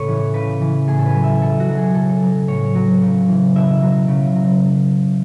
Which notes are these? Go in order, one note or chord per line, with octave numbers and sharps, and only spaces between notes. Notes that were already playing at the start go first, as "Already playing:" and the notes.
Already playing: A2 C#3 A4 B4 C#5
E3
C#3 B4
E3
A2 G#4
A4
B4
F#3
E5
B2 A4
F#4
F#3
G#4
C#3 A4
F#3
A2 C#5
F#3
C#3
E3
B2 E5
F#3
C#3
F#3